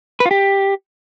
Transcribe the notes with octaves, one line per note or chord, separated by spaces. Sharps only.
B4
F4
G4